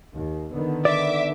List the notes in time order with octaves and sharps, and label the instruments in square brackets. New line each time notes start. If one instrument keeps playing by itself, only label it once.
[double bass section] D#2
D3 D#3 B3
[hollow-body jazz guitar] D5 [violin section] E5 D6